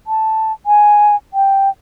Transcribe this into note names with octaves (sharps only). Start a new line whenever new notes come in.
A5
G#5
G5